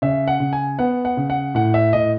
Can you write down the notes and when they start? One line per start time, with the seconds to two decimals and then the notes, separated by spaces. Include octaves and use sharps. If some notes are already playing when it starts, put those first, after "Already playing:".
0.02 C#3 E5
0.28 F#5
0.40 C#3
0.53 G#5
0.79 B3 F#5
1.05 F#5
1.17 C#3
1.30 F#5
1.55 A2 F#5
1.74 E5
1.93 A2 D#5